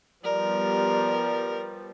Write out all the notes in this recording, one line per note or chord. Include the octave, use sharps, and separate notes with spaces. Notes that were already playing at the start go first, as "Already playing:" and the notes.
F3 G3 B3 A#4 D5